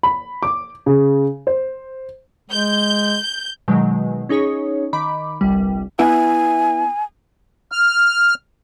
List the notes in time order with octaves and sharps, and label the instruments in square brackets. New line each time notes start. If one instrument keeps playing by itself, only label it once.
[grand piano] B5
D6
C#3
C5
[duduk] G#3 [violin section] G6
[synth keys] B2 D#3 F#3 G#3
C#4 D#4 G#4 C#5
D#3 B5 D6
G1 C2 G3
[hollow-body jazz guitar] B3 E4 E5 [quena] G#5
[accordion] F6